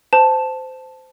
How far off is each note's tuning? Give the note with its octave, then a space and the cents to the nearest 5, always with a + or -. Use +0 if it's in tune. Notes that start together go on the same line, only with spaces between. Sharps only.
C5 -20 A5 -5